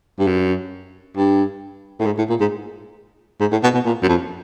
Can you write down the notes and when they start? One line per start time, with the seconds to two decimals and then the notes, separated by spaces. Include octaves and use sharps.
0.19 G2
0.27 F#2
1.16 G2
2.00 A2
2.06 G#2
2.18 A2
2.29 A#2
2.40 G#2
3.40 G#2
3.52 A2
3.63 B2
3.74 B2
3.85 A#2
4.03 F#2
4.08 F2